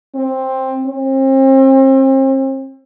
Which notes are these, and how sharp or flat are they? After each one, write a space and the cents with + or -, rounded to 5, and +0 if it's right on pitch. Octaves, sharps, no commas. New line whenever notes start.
C4 +10
C4 +40